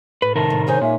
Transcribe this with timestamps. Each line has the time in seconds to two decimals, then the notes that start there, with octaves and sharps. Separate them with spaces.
0.22 A2 B4
0.36 C3 D#3 A#4 A5
0.50 A2
0.67 G#3 C#4 D#4 C5 G#5
0.81 A#2 E5 G#5